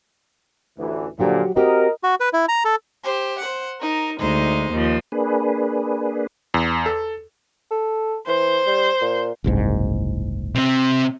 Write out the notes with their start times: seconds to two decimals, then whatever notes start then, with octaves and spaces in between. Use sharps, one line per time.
0.79 A1 D2 E3
1.19 A#2 D3 F3 F#3 F#4 G4
1.56 C4 F#4 G4 A#4 D#5
2.04 F#4
2.20 B4
2.33 E4
2.48 A#5
2.65 A4
3.04 G4 C5
3.38 C5 F#5
3.81 D#4 A#4
4.18 D2 G#3 D#4 C5
4.70 D#2 F3
5.12 A#3 D4 G#4 B4
6.54 E2
6.86 A4
7.71 A4
8.27 E3 C5
8.66 G3
9.01 A#2
9.44 F#1 C2 G#2
10.55 C3 C4